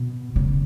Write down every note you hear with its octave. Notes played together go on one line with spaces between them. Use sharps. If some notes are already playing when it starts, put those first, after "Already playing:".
Already playing: B2
C#3